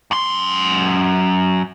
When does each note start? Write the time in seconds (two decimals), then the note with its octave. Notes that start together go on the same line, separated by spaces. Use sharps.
0.11 F#2 C6